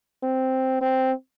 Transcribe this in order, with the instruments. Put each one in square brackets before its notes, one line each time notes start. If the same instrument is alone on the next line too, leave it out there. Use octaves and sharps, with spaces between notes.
[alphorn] C4
C4